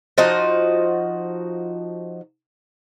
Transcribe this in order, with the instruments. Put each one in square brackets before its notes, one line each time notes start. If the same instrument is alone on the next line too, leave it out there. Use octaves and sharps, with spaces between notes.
[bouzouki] F3 D#4 F#4 D#5